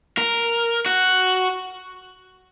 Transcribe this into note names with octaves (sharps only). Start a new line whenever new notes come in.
A#4
F#4